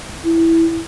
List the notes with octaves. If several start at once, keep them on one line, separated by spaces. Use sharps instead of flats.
E4